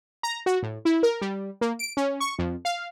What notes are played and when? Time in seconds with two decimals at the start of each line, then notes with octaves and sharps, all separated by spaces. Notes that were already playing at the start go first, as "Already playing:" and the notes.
0.23 A#5
0.46 F#4
0.63 A2
0.85 E4
1.03 A#4
1.21 G3
1.61 A#3
1.79 D7
1.97 C#4
2.20 C#6
2.39 F2
2.65 F5